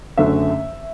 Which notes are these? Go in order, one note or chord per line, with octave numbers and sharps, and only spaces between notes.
F#1 F#2 D3 A3 C#4 E5